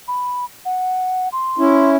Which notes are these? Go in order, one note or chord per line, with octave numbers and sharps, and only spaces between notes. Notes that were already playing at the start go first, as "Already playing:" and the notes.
B5
F#5
C6
C#4 E4